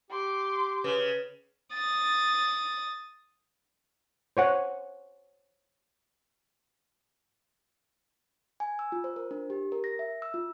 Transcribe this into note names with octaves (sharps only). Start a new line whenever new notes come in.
G4 C6 D6
C#3 B4
D#6 A6
C5 C#5 F#5
G#5
E6
F4
C5
A#4
D4
G4
A#4
A#6
E5
E6
F4